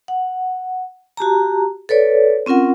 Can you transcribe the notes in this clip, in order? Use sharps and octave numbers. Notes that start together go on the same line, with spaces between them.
F#5
F#4 G4 A5 A#5
A4 B4 C#5 D5
C4 C#4 F4 A#4 F#5